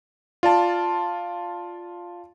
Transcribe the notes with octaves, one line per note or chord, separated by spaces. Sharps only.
F4 D5 A5